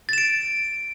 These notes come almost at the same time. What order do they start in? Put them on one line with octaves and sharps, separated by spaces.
A6 E7 D7